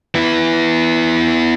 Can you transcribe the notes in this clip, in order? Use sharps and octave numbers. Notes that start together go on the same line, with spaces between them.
B3 E4